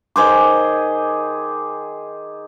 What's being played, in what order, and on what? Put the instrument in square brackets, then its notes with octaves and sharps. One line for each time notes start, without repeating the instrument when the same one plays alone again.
[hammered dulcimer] D#3 G#4 C5 D6